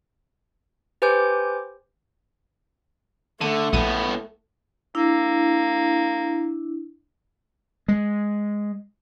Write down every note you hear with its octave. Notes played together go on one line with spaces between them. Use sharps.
G4 B4 C5 G#5 D6 G6
D3 A3 D#7
A#1 A2 B3 D#7
A#3 D4 E4
G#3